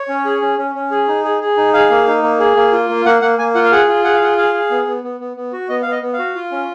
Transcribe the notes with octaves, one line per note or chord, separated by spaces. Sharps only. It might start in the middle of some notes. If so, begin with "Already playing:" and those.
Already playing: C#5
C#4
G#4
C#4
C#4
C#4
G#4
D#4
G#4
G#4
D#4
G#4 F5
A#3
D#4
A#3
G#4
A#3
F4
A#3
A#3 F#5
A#3 F#5
A#3 G#5
F4 F#5
F5
G#4 F#5
F4
G#4 F#5
F5
F4 F#5
G#4 F5
G#4
B3
B3
B3
B3
B3
F#4
B3 D#5
B3 F5
D#5
B3
F5
F#4
F4
C#4